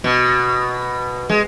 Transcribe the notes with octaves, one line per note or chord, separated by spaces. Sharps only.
B2
G#3